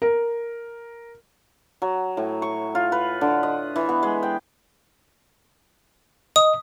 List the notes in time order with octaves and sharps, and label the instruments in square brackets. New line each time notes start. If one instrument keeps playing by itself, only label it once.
[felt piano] A#4
[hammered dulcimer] F#3
A2
C#6
F4
B4
D3
D#5
E3
B3
G#3
G5
[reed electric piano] D#5 [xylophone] D#6